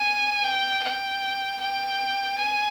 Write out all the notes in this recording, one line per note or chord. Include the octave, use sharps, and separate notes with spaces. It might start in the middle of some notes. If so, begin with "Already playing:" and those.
Already playing: G#5
G5
G5
G5
G#5